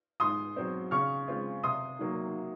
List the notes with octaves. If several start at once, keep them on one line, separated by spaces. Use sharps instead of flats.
G#2 C6 D#6
F#3 C4
C#3 C#6 F6
G#3 C4 F4
C3 C6 D#6
D#3 F#3 A#3